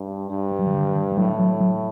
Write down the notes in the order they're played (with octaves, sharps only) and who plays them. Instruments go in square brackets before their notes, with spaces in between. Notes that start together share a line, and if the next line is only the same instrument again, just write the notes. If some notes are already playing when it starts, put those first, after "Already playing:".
Already playing: [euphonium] G2
G2
[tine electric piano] G3
F#3
D#3
D3
D#3
G3
[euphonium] A2 [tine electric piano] F#3
[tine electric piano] F#3
F#3